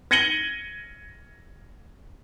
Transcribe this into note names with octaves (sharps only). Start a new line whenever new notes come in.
G#6 A#6 C#7 D#7 F#7 G7